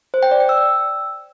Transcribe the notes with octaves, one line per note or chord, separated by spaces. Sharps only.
C5
G5
D5
G5
E6